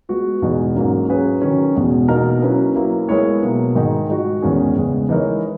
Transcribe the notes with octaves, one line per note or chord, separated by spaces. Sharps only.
G#3 B3 F#4
E2 B2 G#3 D#4 G#4
G#2 F#3 A#3 C#4
F#3 C#4 G#4 B4
D#3 F#3 C#4
E2 B2 G#3
B2 A#3 D#4 A#4
F#3 A#3 C#4 E4 B4
F#3 A#3 E4
G#3 B3 E4 A#4 C#5
B2 F#3 A#3
G#2 D#3 G#3 D#4 G#4
G#3 D#4 F#4
E2 D#3 G#3 C#4 G#4
E2 C#3 G#3
E3 G#3 D#4 A#4 C#5